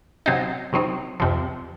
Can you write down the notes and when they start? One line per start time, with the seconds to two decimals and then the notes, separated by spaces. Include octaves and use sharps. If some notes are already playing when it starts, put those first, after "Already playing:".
0.26 C3 F#3 C4 D#4
0.73 C3 F#3 C4 D#4
1.20 F2 C3 F3